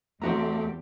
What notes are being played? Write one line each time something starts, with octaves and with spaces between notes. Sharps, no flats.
E2 C3 A3 C4 F#4 G4 A#5